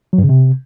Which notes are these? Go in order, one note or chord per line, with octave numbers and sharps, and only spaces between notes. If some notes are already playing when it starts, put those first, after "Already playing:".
F#3
G2
C#3
C3